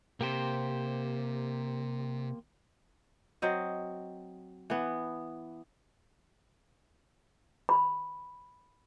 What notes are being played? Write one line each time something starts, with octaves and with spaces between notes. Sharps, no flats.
C3 A#3 G4 C5
F#3 C4 D#5
E3 B3
B5